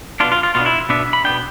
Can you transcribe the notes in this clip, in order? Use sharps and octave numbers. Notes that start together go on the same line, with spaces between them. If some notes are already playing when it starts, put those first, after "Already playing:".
B2 B3 D4 F4
F4
F4
B2 B3 D4 F4
E4
B2 B3 D4 E5
B5
B2 B3 D4 G5